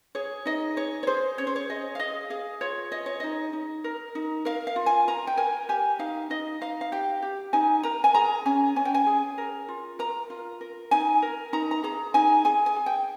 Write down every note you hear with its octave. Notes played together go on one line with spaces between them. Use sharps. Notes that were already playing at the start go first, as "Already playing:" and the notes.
G#4 C#5
D#4 D#5
G#4 C#5
C#5
G#4 C5
C#4 C#5
C5
C#5
G#4 D#5
F5
G#4 D#5
G#4 F5
F4 C#5
G#4 D#5
C#5
D#4 D#5
D#4
A#4
D#4
A#4 F5
F5
F4
G#5
A#4 A#5
G5
A#4 G#5
G4 G#5
D#4 F5
D#4 D#5
D#4 F5
F5
G4 G5
G4
D#4 G#5
A#4 A#5
G#5
G#4 A#5
C#4 G#5
C#4 G#5
G5
G#5
G#4
A#4
F4
A#4 A#5
F4
A#4
D#4 G#5
A#4
D#4 A#5
A#5
G#4 A#5
D#4 G#5
G#4 G#5
G#5
G#4
G5